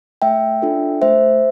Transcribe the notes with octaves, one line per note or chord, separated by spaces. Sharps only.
A3 E5 G5
D4 F4 A4
A3 C5 E5